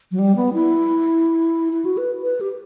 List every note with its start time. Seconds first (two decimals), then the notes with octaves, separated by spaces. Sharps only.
0.12 F#3
0.19 G3
0.36 B3
0.53 E4
1.73 E4
1.85 F#4
1.97 B4
2.23 B4
2.41 G4